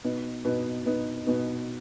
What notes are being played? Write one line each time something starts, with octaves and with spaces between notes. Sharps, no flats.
B2 B3 D#4
B2 B3 D#4
B2 B3 D#4
B2 B3 D#4